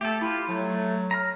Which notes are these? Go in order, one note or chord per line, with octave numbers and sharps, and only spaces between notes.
A3 G4 A4
E4 F4 G4
F#3 A3
A#5 F6